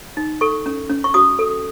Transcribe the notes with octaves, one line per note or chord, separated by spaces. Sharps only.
D#4
A4 C#6
C#4
C#4
C#6
F#4 D#6
A4